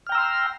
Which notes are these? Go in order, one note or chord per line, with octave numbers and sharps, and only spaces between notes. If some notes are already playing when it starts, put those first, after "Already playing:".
G5 A#5 C6 E6 F6